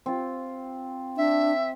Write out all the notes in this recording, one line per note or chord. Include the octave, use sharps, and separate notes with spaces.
C4 F4
D4 E5